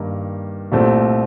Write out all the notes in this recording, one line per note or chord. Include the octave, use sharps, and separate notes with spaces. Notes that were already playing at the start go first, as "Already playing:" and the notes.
Already playing: G2 D#3 A#3
C2 A#2 A3 C4